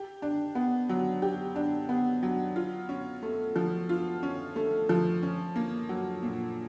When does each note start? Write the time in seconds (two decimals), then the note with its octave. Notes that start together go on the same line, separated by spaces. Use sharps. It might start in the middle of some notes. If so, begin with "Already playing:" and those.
Already playing: G4
0.22 D4
0.55 B3
0.89 F#3
1.22 G4
1.56 D4
1.89 B3
2.23 F#3
2.56 F4
2.89 C#4
3.23 A3
3.56 F3
3.89 F4
4.23 C#4
4.56 A3
4.89 F3
5.23 C#4
5.56 A#3
5.89 F#3
6.23 A#2